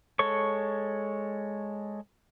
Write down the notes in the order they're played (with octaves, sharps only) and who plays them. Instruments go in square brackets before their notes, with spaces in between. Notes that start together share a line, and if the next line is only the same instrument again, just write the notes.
[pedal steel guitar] G#3 A4 C#5 C#6